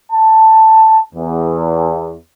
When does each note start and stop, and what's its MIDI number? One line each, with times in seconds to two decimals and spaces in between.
0.12 1.01 81
1.15 2.14 40